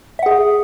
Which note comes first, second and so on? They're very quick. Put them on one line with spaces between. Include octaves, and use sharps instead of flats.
E5 F#5 G#4